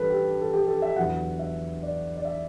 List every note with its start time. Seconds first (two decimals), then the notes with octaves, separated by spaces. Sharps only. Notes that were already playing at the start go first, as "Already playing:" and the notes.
Already playing: G2 E3 G4 A4 B4
0.10 G4
0.41 A4
0.53 G4
0.68 A4
0.82 E5
0.96 E2 D3 F#3 F#5
1.39 E5
1.83 D5
2.17 D5
2.25 E5